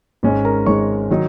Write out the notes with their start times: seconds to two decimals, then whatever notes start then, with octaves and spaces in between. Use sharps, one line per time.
0.23 G#1 G#2 G#3 C#4
0.45 A#4 A#5
0.66 G#1 G#2 G#3 C#4 C#5 C#6
1.10 D#3 F#3 D#4